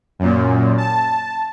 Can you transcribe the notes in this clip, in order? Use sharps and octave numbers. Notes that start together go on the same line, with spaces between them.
F#2 A#2
A5